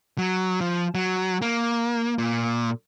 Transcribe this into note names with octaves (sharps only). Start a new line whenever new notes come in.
F#3
F3
F#3
A#3
A#2